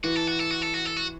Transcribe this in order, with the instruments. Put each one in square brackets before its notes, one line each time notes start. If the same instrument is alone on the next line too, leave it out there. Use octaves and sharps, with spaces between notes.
[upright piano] E3 [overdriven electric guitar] F#4
[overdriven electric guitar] A4
F#4
A4
F#4
A4
F#4
A4
F#4